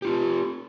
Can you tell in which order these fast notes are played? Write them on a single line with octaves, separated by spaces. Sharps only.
G4 F4 C4